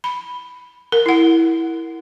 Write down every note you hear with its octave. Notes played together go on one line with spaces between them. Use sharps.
B5
A#4
E4 F#5